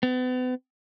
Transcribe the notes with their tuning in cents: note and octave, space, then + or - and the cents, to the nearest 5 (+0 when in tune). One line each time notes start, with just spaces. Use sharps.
B3 +40